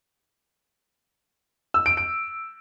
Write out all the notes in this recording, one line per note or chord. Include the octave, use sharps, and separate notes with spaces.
E6
D7
D7